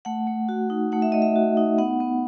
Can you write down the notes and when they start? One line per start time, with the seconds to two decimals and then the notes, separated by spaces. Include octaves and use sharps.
0.05 A3 F#5
0.27 A3
0.49 F#4
0.70 D#4
0.92 A3 F#5
1.02 E5
1.12 A3 D#5
1.22 E5
1.36 F#4
1.57 D#4
1.78 B3 F#5
2.00 B3